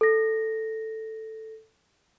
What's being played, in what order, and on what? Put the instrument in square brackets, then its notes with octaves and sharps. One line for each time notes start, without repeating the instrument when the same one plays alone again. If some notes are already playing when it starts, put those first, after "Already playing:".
[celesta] A4 A#6